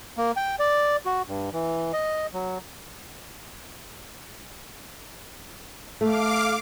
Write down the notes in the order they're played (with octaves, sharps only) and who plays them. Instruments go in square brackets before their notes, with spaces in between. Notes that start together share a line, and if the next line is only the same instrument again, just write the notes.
[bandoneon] A#3
G5
D5
F#4
G2
E3
D#5
F#3
[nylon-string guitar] A3 [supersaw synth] F5 D6